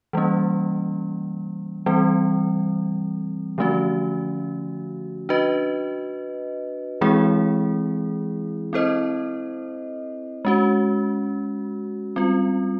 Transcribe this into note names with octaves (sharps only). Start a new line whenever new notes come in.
E3 G3 A#3 C#4
E3 G3 C4
D3 F3 A3 C#4 F#4
D4 F#4 B4 D#5
E3 G#3 C4 E4 G#4
C4 E4 A4 C5 D#5
G#3 C#4 F#4
G3 C4 F4